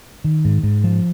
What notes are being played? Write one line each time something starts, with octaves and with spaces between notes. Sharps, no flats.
D#3
G#2
G#2
F3